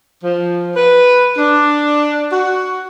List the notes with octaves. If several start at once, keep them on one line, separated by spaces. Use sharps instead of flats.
F3
B4
D4
F#4